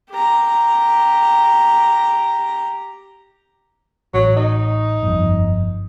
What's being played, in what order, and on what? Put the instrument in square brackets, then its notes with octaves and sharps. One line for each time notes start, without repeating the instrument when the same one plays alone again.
[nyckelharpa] G4 A#5
[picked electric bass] A1 [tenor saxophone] F#3
[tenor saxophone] D#4
[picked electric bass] G1 F2